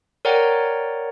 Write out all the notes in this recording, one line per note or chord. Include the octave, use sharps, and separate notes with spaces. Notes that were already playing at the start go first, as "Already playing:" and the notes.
A#4 C#5 D5 F#5 G5 A#5